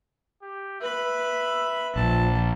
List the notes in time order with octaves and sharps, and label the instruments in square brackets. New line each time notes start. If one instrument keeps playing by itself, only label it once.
[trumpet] G4
[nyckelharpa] B4 B5 [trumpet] E5
[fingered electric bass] A#1 [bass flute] F3 [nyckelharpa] A5